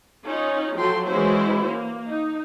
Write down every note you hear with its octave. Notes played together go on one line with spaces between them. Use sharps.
C#4 D#4 F4
F3 F#3 A4 G5 C6
E3 G#3 C#4 E4 F#4 C5
A#3
D#4